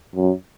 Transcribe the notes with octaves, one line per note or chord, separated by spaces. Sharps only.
F#2